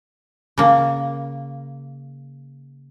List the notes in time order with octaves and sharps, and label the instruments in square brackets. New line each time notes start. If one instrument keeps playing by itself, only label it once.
[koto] C#3 A#3